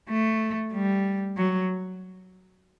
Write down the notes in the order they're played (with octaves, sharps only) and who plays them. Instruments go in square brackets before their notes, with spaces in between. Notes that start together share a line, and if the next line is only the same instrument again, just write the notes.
[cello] A3
G3
F#3